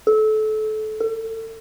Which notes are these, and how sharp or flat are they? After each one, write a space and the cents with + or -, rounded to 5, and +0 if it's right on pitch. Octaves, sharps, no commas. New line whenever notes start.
A4 -25
A4 +35